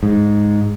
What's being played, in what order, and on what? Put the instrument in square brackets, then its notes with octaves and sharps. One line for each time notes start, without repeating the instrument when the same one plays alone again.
[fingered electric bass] G#2